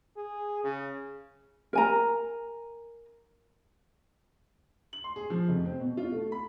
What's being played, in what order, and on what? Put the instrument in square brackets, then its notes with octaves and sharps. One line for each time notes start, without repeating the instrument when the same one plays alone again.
[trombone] G#4
C#3
[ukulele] A#4 G#5 A#5
[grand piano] F#7
C6
G#4
F3
F1
C4
B2
F4
A3
B5